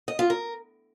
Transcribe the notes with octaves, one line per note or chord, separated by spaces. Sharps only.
D#5
F4
A#4